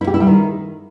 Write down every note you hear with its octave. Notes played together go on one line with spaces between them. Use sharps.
E4
G4
E4
G3
D#3